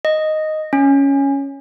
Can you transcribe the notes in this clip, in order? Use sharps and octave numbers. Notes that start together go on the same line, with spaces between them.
D#5
C#4